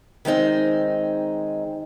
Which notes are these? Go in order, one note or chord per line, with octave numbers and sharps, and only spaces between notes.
D#3 G#3 C4 D#4